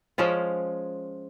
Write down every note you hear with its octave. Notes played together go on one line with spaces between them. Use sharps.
F3 G#3 C#4 F4